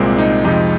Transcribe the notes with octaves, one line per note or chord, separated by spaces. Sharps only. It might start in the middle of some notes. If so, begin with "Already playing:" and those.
Already playing: C2 A#2 G#3 C4
D#4
F2 C3 F3 G#3 D#4